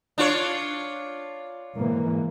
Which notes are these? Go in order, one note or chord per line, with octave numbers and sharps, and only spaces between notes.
D4 F4 C#5
G#2 E3 A#3